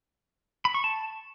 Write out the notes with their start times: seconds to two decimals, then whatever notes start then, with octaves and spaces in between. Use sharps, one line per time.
0.65 B5
0.74 C#6
0.84 A5